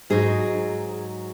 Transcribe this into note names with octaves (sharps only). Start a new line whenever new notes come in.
G#2 F#3 D#4 G#4